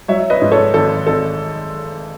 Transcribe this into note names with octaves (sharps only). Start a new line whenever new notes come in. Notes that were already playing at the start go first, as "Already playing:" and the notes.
F#3 C#5 E5
B4 D#5
G#2
A4 C#5
G#1 A4
G#1 A4